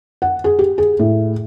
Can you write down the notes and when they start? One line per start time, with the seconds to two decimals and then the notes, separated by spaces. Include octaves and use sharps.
0.22 F#5
0.44 G#4
0.59 G4
0.78 G#4
0.99 A2